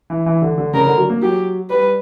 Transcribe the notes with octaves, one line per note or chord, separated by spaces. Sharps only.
E3
E3
D3
D3
C#3 A#4
D3
F#3
A#3
F#3 G4
G3 B4